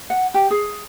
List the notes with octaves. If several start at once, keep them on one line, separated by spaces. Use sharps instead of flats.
F#5
G4
G#4